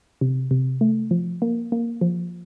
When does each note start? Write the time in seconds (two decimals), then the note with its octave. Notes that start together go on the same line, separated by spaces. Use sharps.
0.21 C3
0.51 C3
0.81 A3
1.11 F3
1.42 A#3
1.72 A#3
2.01 F3